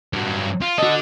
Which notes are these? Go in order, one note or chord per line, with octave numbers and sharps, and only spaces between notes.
G2 F#3
F4
D4 F#4 A4 D#5